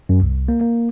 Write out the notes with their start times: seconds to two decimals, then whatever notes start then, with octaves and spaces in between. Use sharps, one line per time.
0.09 F#2
0.22 C2
0.48 A#3
0.61 A#3